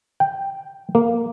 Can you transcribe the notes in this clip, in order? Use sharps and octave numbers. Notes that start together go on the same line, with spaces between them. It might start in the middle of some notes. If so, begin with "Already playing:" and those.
G5
A#3